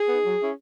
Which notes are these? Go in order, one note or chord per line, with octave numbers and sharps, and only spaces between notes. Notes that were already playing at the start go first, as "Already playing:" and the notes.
Already playing: G#4
B3 D#4
F#3
C#4 E4